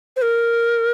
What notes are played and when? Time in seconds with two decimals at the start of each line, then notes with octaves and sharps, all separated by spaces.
0.16 C5
0.22 A#4